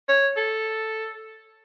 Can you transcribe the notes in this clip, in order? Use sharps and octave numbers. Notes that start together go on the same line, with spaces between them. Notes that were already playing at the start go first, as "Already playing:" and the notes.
C#5
A4